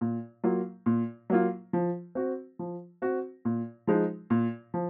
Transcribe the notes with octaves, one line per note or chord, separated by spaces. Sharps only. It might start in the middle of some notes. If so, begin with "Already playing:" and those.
A#2
F#3 A#3 F4
A#2
F#3 A#3 F4
F3
C4 F#4
F3
C4 F#4
A#2
F3 G#3 D#4
A#2
F3